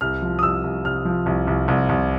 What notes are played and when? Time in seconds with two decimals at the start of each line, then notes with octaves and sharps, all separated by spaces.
0.01 C2 F6
0.22 F3
0.39 D#6
0.43 C2 E6
0.64 C2
0.85 C2 F6
1.05 F3
1.26 C2
1.47 C2
1.68 C2
1.89 C2